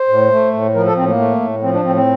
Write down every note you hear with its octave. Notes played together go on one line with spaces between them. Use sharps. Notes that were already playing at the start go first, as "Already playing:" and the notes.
Already playing: C5
A2
A3
A2
F3 A#4
A4
A2 C4
A#3
A3
A2
F3 C4
D4
A2 C4
C4